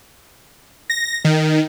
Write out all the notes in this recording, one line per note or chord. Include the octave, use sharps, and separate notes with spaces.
A#6
D#3